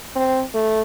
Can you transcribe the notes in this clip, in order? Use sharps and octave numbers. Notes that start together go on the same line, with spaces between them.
C4
A3